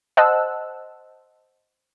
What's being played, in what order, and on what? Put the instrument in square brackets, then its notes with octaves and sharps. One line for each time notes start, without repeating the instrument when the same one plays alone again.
[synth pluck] C5 D#5 F#5 A5 E6 F#6